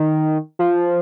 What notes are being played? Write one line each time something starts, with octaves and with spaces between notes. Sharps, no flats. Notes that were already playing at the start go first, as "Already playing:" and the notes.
Already playing: D#3
F3